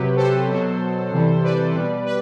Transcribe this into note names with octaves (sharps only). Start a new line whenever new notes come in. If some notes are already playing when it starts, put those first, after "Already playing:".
Already playing: C3 F#3 G4 B4
A4 C5
B2 F#3
C3 E3 G3
B4 D5
B2 G3
B4